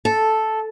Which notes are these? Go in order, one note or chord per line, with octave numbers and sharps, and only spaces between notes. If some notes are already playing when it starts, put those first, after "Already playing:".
A4